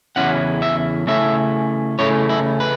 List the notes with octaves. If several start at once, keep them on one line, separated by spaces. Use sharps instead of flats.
E2 C#3 A3 C#4 E4 F#5
E5
C#3 A3 C#4 E4 E5
C#3 A3 C#4 E4 C#5
E4
B4